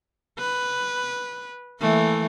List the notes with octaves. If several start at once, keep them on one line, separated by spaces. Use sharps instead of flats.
B4
E3 A3 A#3